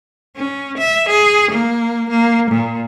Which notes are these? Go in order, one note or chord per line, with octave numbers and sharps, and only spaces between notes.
C#4
E5
G#4
A#3
A#3
A#2